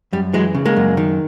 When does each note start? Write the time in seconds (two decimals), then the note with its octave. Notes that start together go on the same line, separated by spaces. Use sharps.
0.13 F#2 G3
0.33 E3 F#3 G#3
0.55 C#3
0.65 G#3 A#3
0.77 F#2
0.97 D#3